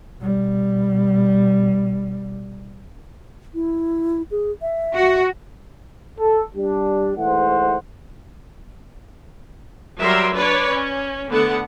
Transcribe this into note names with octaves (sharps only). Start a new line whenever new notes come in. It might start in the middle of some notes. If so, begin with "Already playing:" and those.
B2 G3
E4
G#4
E5
F#4
A4
G3 D4
G#2 E3 A3 C5 F#5
F#3 G3 A#4 E5 C6
D4 B4 C#5 D5
C#4
D3 A3 B3 F#5